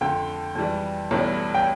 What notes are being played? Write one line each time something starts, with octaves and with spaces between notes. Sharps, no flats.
F2 D3 A3 G5
F2 E3 G3
B1 A2 E3 G3
G5